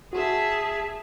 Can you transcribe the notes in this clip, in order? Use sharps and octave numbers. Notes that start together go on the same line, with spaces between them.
F#4 G#4 E5 A5